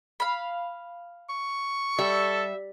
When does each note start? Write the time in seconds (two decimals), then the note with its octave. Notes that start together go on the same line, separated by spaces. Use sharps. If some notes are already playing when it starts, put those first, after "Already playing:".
0.20 F5 B5
1.29 C#6
1.99 G3 A4 E5